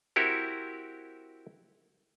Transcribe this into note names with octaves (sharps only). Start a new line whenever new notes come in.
C4 E4 F#4 G4 A#4